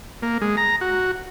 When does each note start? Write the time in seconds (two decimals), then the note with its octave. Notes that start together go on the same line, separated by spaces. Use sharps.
0.22 A#3
0.41 G#3
0.57 A#5
0.81 F#4